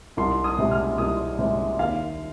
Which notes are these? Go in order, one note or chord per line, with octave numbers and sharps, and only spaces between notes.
C2 C6
D#6
C3 G#3
F6
C2 D#6
C3 G#3
D#2 F5